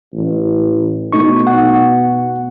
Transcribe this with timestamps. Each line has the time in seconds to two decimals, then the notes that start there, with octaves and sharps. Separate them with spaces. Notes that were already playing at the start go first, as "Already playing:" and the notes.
0.13 A1
1.13 B2 A3 D#4 C#6
1.47 F#5